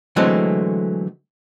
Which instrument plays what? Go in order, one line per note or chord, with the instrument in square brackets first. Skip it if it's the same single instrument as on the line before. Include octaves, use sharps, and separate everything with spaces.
[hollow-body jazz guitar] D3 E3 F#3 G#3 A3 C4